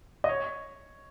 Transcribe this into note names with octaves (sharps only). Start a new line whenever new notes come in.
D#5
C#5